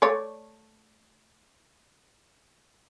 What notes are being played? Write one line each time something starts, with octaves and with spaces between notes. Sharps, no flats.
A3 C#5 D5